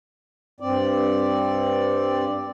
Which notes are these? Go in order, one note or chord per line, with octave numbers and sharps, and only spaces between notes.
G2 C4 D5